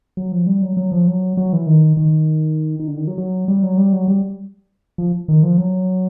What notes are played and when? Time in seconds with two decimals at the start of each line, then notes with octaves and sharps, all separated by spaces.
0.17 F#3
0.32 F3
0.47 G3
0.62 F#3
0.77 F#3
0.92 F3
1.07 F#3
1.37 F#3
1.53 E3
1.67 D#3
1.97 D#3
2.80 D#3
2.88 D3
2.97 D#3
3.08 F#3
3.18 F#3
3.48 G3
3.63 F#3
3.77 G3
3.93 F#3
4.08 G3
4.98 F3
5.28 D#3
5.43 F3
5.58 F#3